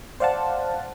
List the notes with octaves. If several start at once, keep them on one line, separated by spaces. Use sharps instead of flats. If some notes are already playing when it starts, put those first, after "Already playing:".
C5 D5 F5 F#5 A5